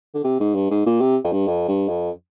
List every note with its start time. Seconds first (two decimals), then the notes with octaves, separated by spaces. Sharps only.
0.14 D3
0.24 C3
0.40 G#2
0.55 G2
0.71 G#2
0.86 A#2
1.01 C3
1.24 F2
1.32 G2
1.47 F2
1.68 G2
1.89 F2